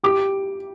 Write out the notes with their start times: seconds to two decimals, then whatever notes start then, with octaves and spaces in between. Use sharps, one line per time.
0.03 G4 D6